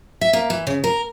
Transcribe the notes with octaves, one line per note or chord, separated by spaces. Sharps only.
E5
A#3
E3
C#3
A#4